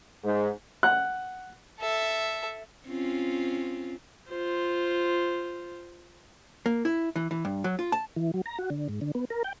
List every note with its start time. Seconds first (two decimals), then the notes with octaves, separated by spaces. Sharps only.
0.24 G#2
0.83 F#5 F#6
1.79 A4 E5
2.87 C4 C#4 F4
4.29 F4 C5
6.66 A#3
6.85 E4
7.16 E3
7.31 E3
7.45 G2
7.64 F#3
7.79 F4
7.92 A5
8.16 E3
8.34 F#3
8.46 A#5
8.59 F#4
8.70 D3
8.89 G#2
9.01 D3
9.15 B3
9.30 A#4
9.44 G5